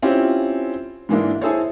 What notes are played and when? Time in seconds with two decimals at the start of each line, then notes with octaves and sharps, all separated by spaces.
0.03 C4 C#4 E4 F4 G4
1.09 G#2 E3 G#3 A#3 D4 E4
1.42 E4 G#4 A4 C5 C#5